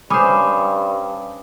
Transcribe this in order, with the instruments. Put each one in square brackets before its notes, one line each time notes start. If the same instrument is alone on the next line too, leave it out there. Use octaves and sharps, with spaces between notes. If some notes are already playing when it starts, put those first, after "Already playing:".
[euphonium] G2 [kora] C#4 C5 [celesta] B5 D6 D#6